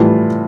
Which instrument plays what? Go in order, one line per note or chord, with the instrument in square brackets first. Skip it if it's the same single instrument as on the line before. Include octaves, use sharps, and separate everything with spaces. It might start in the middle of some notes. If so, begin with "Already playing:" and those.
Already playing: [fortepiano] A2 E3 G3 F4